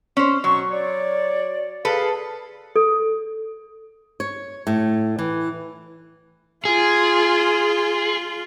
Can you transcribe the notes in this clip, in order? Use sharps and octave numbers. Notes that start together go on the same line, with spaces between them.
C#4 C5
B2 F#3 C#5 C#6
C#5 D5
G#4 A4 B4 F5
A4
C#5
A2
E3
F4 G#4